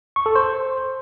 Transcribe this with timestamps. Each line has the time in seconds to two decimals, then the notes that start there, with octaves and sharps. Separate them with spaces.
0.16 C#6
0.26 A4
0.35 C5